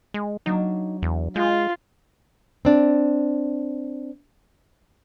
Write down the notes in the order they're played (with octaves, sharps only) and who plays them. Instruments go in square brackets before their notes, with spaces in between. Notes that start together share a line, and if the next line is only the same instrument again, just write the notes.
[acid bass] G#3
[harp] F#3 A#3 D4 [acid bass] D#4
[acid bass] E2
[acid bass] G#3 [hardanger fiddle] F4 [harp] G6
[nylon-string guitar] C4 D4